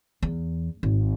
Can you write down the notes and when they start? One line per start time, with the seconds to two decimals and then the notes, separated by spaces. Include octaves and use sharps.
0.23 E2
0.83 G#1